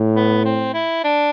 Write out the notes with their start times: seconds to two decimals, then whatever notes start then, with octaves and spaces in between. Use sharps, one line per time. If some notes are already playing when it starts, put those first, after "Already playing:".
Already playing: A2
0.15 B3
0.45 C4
0.74 E4
1.04 D4